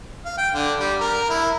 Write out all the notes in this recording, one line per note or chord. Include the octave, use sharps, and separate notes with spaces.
F5
G5
D3
G3
A#4
E4